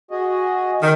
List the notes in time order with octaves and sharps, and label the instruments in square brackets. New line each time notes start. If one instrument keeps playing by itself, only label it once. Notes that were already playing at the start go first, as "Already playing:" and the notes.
[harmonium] F#4 G#4 D#5
[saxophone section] D#3